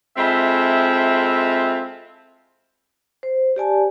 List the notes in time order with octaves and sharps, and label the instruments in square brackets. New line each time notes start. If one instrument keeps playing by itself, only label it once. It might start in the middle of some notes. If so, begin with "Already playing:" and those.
[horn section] G#3 C4 E4 F4 A4 E5
[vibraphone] C5
G4 D5 G#5 A5